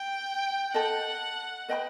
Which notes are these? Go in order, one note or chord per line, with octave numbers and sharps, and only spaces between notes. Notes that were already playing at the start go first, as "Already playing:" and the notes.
Already playing: G5
A4 D#5 F#5 A5
B4 D#5 G5 B5